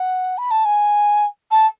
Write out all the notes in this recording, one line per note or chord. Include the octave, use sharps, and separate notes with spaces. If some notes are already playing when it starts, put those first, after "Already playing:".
Already playing: F#5
B5
A5
G#5
A5